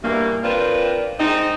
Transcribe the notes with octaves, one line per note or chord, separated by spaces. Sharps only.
G2 B2 E3 A#3
C4 D4 F4 A#4 B4
G#3 C4 D#4